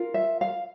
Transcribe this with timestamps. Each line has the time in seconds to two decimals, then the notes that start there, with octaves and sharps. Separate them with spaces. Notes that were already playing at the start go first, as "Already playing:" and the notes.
Already playing: F4 A#4
0.14 E5
0.41 F5